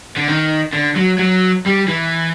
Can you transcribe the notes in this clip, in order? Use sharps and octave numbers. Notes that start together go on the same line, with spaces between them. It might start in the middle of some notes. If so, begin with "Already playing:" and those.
D3
D#3
D3
F#3
F#3
G3
E3